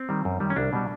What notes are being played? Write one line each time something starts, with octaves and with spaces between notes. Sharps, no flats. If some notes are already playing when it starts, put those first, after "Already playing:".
Already playing: C4
D#3 G3
F#2
D#3 G3
C#4
C2 D4
B2 G3